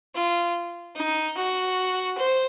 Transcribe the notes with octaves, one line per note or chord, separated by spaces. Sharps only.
F4
D#4
F#4
C5